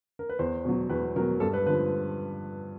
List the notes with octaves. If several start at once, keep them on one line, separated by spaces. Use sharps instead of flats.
A#4
B4
E2 C5
B2 F#3
E2 B4
B2 F#3 A#4
G2 A4
B4
D3 F3 B4